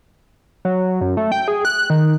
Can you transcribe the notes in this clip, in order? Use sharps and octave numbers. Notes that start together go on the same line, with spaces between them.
F#3
F#2
A3
G5
G#4
F#6
D#3